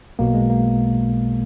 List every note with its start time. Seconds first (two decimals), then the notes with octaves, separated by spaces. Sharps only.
0.19 B1 B2 A#3
0.34 G#3
0.50 A#3